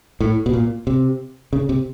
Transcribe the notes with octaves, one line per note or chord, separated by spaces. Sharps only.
A2
B2
A#2
C3
C#3
C3